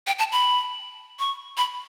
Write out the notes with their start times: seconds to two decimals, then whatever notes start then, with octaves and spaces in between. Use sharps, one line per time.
0.07 G5
0.19 A5
0.32 B5
1.19 C#6
1.57 B5